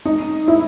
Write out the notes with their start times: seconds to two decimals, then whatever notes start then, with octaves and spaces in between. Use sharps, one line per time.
0.05 D#4
0.48 E4